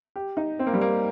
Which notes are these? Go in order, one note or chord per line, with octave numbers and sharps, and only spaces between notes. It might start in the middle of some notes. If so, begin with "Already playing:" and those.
G4
D#4
C4
A#3
G3
A#3